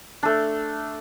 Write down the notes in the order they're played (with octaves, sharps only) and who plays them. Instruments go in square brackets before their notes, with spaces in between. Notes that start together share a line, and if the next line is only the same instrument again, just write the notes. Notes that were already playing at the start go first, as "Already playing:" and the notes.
[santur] A3 D4